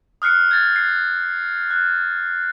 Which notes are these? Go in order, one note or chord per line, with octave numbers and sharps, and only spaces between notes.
D#6 F6 F#6 C7 C#7
G#6 A6
C7
F#6